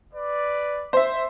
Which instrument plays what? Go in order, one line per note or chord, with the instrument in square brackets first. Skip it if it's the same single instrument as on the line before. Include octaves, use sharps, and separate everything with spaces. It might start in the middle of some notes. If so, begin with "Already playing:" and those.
[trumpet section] B4 D5
[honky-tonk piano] C5 E5